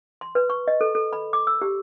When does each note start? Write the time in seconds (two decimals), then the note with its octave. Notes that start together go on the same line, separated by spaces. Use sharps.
0.21 C6
0.35 B4
0.50 C#6
0.68 D#5
0.81 A4
0.95 A4
1.13 B5
1.33 D6
1.47 E6
1.62 G4